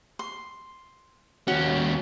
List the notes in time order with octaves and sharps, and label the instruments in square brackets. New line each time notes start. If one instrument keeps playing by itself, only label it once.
[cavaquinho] C6
[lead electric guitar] D#2 C#4 [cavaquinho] F#4